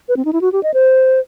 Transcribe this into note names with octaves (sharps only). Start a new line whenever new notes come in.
B4
C4
D#4
E4
F#4
G4
D#5
C5